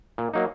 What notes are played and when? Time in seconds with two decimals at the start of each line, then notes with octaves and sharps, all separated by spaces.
0.18 A#2
0.34 F#3 A#3 D#4